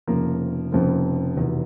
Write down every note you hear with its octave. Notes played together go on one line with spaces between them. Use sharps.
F1 F2 C#3 F3 A#3
F1 F2 C#3 F3 A#3
F1 E2 B2